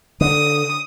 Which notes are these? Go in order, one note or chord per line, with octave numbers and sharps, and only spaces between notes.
D3 D#6